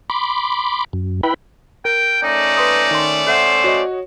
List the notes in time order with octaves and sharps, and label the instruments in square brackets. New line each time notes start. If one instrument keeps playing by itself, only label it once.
[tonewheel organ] B5 C6 D6
F#2
E4 B4 G5 B5
[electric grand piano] A#4 [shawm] G5
[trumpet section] A3 C#4 D5 [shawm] D#4
[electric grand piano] B4 C6 D#6
D#3 C6
[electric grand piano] A4 E5 F#5 [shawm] C5
[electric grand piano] F#4 C#5 D#5